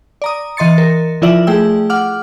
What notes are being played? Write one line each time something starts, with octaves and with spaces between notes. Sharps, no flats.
D5 A#5 D#6
E3 D#5 C6 A6 C#7
A#4
F3 E4 F4 D5 E5 F#7
A3 G#4 G5 E6
F#5 D6 F6